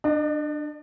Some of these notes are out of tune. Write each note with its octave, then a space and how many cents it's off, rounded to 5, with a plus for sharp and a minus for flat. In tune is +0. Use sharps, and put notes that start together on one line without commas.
D4 +20 D#5 -35